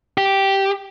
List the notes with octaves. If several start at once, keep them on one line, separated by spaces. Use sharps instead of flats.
G4